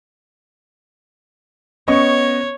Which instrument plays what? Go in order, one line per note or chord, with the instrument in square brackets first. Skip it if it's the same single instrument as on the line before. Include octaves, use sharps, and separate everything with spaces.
[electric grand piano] B3 [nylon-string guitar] C#4 [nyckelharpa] C#5 [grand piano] D#5 C#6